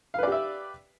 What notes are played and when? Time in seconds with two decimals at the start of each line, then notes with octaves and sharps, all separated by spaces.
0.14 F5
0.18 B4
0.23 D5
0.27 G4
0.32 E5